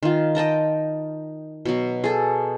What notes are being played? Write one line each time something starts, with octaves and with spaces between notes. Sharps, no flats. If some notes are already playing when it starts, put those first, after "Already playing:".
D#3 F4
D#5 G5 A5 A#5
B2 F#3
G#4 A4